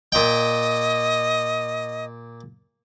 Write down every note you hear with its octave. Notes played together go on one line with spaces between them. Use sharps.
A#2 D#5 G5